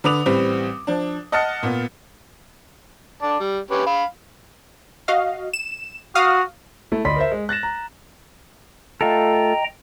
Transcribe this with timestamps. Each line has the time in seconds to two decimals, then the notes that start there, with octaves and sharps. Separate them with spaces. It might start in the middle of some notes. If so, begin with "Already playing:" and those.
0.04 D3 B4 D6 D#6 F7
0.26 A1 G3 C4 B4
0.87 F3 D4
1.32 D#5 F#5 A5 F6 A6 C#7
1.63 A#2 B3
3.22 D3 D5 A5
3.40 G3
3.71 C#4 G4 B4
3.86 F5 B5
5.08 F#4 D#5 F5
5.53 E7
6.15 F#4 F5 D#6 F6
6.92 A3 E4
7.05 D2 D5 D#5 B5 C6 B6
7.16 A#4 C5 E5
7.32 G#3
7.49 F#6 A6 A#6 E7
7.63 A#5
9.01 A3 F4 A4 D#5 G5 A#5